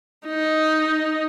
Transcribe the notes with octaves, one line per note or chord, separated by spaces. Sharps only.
D#4